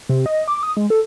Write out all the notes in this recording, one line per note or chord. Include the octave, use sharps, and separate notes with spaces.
C3
D#5
D6
D#6
G#3
A4